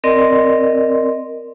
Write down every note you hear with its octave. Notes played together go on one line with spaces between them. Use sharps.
C4 A#4 D5 D#5 C6